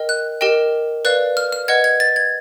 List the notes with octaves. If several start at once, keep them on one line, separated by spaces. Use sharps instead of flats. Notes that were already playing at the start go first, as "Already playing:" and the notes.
Already playing: A#4 D#5 G5
F#6
G4 A#4 D#5 G5
B4 D5 F5 F#6
F6
F6
B4 D#5 F#5 G#6
G#6
A6
G#6